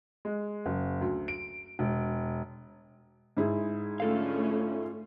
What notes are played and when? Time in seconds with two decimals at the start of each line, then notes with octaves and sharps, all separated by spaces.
0.25 G#3
0.66 F#1
1.01 D2
1.28 D7
1.79 E1
3.37 G#2 E4 G#4
4.00 D3 A3 C#4 F4 A4 F5